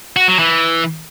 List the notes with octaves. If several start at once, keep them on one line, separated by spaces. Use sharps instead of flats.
F#4
F#3
E3